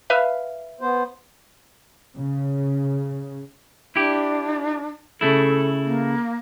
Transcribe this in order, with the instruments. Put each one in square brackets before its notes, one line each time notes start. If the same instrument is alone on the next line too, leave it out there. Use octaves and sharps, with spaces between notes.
[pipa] B4 E5 F5
[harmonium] B3 C5
[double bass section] C#3
[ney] D4 [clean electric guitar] E4 G4
[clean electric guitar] C#3 A3 E4 [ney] A4
[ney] A#3